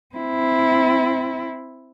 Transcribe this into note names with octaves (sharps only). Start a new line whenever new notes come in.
C4 E4